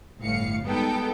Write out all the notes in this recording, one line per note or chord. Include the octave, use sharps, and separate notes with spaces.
G1 A2 F5 C#7
G3 G#3 B3 D#4 A4 G5